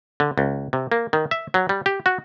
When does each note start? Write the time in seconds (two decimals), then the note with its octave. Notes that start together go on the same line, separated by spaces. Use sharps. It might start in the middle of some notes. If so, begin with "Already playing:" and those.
0.20 D3
0.38 C#2
0.73 C3
0.92 A#3
1.13 D#3
1.31 E5
1.54 F#3
1.69 G3
1.86 G4
2.06 F#4